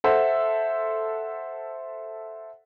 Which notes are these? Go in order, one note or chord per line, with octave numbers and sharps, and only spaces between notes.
A4 C5 E5 F#5